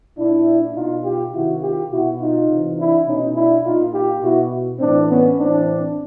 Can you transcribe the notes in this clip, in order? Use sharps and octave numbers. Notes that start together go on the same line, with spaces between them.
A#2 D4 E4
B2 D#4 F4
F4 G4
C3 D#3 E4 F#4
F4 G4
B2 E4 F#4
D#4 F4
C3 E3
D4 E4
B2 C#4 D#4
D4 E4
A#2 D#4 F4
F4 G4
B2 E4 F#4
A2 E3 C4 D4
B3 C#4
A2 E3 C4 D4